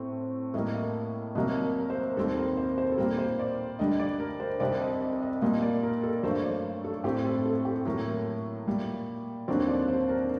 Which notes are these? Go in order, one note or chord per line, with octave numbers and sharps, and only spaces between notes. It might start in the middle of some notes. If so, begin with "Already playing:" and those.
Already playing: A2 A3 C4
A2 G3 A#3 D#5
C2 C3 F#3 A#3 D#5
A#4
C5
D#2 D#3 G3 C4 A4
A#4
C5
C5
A4
A#2 G3 A#3 A#4
C5
D5
D2 D3 G3 D#5
D5
A#4
C5
C2 C3 G3 C4 D5
D#5
D5
D#5
A#2 G3 A#3 D#5
D5
A#4
A4
G2 F#3 A3 C5
D5
A4
A2 A3 C4 G4
A4
A4
G4
A4
A2 F#3 A#3 A#4
A#2 G3 A#3
D#2 D3 F#3 C4 D5
D5
C5
A#4